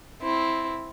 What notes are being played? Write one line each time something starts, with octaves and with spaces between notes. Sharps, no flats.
C4 E4